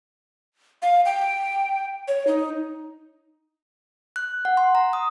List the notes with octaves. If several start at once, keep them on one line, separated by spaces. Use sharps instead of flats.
F5
G5
C#5
D#4
F#6
F#5
C6
A#5
D#6